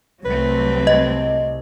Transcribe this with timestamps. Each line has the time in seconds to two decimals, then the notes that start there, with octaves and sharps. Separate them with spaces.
0.25 C2 F#3 A3 C4 B4
0.87 D#5